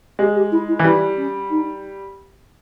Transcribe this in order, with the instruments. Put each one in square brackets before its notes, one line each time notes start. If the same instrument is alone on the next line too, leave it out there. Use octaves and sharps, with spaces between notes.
[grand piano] G#3 [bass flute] G4
[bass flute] G4
E4
E4
[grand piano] E3
[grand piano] G3 [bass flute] E4
[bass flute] C#4
D#4